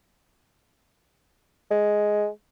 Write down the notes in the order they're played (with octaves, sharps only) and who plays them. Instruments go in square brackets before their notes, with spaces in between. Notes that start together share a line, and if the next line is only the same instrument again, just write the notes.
[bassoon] G#3